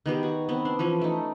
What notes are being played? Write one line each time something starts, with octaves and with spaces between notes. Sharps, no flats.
D#3 B3 G4 G#4
F#4
B3 C4
D4 C6
E3 F3 C#4
A3 D#4